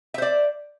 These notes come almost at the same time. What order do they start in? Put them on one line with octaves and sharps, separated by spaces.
E5 C5 D5